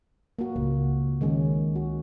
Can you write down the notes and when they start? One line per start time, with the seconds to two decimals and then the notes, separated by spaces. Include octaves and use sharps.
0.39 A#3 F#4
0.56 C#2
1.21 D#3 G#3 C#4
1.76 F#4